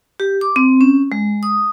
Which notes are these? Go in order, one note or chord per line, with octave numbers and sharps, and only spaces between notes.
G4
D6
C4
C#4
G#3
D#6